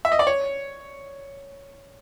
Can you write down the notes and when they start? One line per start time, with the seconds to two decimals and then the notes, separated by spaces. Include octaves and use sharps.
0.05 E5
0.12 D#5
0.19 D5
0.27 C#5